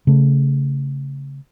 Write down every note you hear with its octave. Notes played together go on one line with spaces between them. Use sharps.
C#3 A3